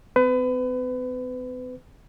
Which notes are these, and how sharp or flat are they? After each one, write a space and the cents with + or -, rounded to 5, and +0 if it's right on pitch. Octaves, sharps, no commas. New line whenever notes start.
C4 -45 B4 +30